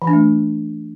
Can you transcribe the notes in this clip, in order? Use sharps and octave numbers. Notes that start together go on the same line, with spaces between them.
E3
D4
A3